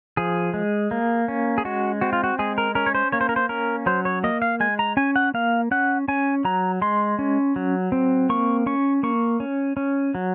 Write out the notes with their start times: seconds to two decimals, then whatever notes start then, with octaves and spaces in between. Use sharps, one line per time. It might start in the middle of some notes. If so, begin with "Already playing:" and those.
0.17 F3 G#4
0.54 G#3
0.91 A#3
1.28 C#4
1.58 G#4
1.65 G#3 F#4
2.01 C4 F#4
2.13 F4
2.24 F#4
2.39 G#3 G#4
2.58 A#4
2.75 C#4 A#4
2.86 C#5
2.95 C5
3.12 A#3 C#5
3.21 C5
3.29 A#4
3.36 C5
3.49 C#4 A#4
3.86 F#3 C5
4.05 C#5
4.24 A#3 D#5
4.42 F5
4.60 G#3 G#5
4.79 A#5
4.97 C#4 G#5
5.16 F#5
5.34 A#3 F5
5.71 C#4 F#5
6.08 C#4 G#5
6.45 F#3 A#5
6.82 G#3 C6
7.19 C#4
7.56 F#3
7.92 C4
8.30 A#3 C#6
8.66 C#4 C#6
9.03 A#3 C#6
9.40 C#4
9.77 C#4
10.15 F#3